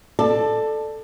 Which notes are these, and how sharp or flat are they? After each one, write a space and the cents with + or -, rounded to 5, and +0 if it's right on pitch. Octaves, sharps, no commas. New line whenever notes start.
A4 +0 D5 +25